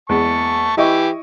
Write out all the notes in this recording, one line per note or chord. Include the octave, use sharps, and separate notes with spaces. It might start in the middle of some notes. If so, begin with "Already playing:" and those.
E2 G#3 A5 C#6
E3 E4 G4 D#5 C#6